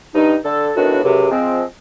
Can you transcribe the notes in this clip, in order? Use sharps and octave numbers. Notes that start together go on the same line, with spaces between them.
G2 D#4
D3 A4
F#2 A2 D#3 B3 D4 F#4
C#2 F#2 C3
F3 G#3 C4